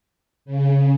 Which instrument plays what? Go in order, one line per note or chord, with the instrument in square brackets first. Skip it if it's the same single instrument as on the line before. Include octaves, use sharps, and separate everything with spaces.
[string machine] C#3